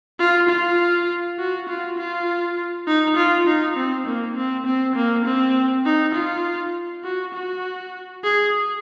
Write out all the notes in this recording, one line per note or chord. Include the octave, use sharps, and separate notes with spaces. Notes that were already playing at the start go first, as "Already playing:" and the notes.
F4
F4
F#4
F4
F4
D#4
F4
D#4
C4
A#3
C4
C4
A#3
C4
D#4
F4
F#4
F#4
G#4